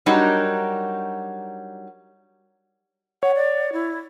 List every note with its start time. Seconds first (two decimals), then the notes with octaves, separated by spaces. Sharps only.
0.06 F#3 G3 D4 D#4 F#4 A#4
3.23 C#5 F#5
3.35 D5
3.73 E4